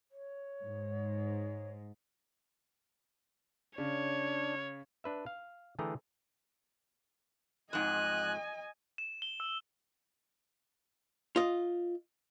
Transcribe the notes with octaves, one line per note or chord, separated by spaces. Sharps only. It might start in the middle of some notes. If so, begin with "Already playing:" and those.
C#5
G#2
C#3 D4 C#5
D4 B4 E5
F5
D3 E3 A3 G#4 G5 A#5
F2 G#2 D#5 G#5 F#6
E7
G7
E6
F4 D#5